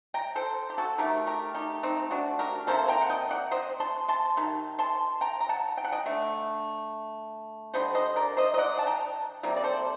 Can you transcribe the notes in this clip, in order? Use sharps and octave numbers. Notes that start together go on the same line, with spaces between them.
G5 A#5
A4 C5
G4
F#4 A4
D#3 A3 G4 A#4
G4 A#4
D#4 G4
C4 D#4
D4 F#4
G4 A#4
C3 G3 A#3 A4 C5
G5 A#5
F#5
D#5 G5
D5 F#5
C5 D#5
A5 C6
A5 C6
D#3 G3
A5 C6
G5 A#5
A#5
F#5 A5
G5
F#5
D#5 G5
D3 A3
D3 G3 C5 D#5
C5 D#5
A#4 D5
C5 D#5
D#5
D5 F#5
A5
G5 A#5
C3 G3 A#3
D5
A4 C5